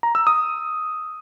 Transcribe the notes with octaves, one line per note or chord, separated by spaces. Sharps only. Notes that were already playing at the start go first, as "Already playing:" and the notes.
A#5
E6
D#6